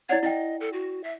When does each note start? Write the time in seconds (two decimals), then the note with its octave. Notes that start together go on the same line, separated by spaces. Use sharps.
0.09 E4 C#5 D5 F#5
0.23 E4 D#5 G5
0.60 A4
0.73 F#4
1.04 E5